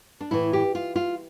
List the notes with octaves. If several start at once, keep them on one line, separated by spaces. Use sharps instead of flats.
D4
A2 E3 E4
G4
F4
F4